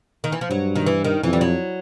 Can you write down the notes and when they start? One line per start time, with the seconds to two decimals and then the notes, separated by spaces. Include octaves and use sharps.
0.24 D#3
0.32 E3
0.41 F3
0.50 G2 F#3
0.76 D#3
0.86 E3
1.04 D#3
1.23 F2 E3
1.33 G3
1.41 F#3